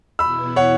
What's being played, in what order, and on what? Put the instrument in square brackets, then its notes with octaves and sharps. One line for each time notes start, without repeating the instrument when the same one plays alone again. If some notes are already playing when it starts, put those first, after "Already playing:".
[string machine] E2 B2 B3 E4 [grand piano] B5 E6
[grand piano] C#5 F#5